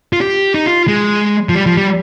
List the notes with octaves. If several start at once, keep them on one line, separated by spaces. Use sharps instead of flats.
F4
G4
D#4
F4
G#3
F3
G3
F3
G3